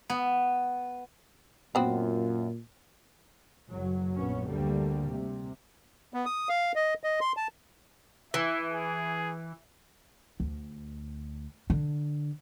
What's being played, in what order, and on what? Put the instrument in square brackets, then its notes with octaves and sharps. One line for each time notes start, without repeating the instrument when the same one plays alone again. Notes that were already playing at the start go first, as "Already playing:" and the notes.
[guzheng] B3
[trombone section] F#2 F4 [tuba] A#2 [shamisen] B3 C4 F#4
[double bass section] F#1 F#3
A#1 B3 C#4
D2 D3 G3 A#3
C3
[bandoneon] B3
D#6
F5
D#5
D#5
C6
A5
[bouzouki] E3 [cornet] E5
[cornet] G#4
[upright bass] D2
D3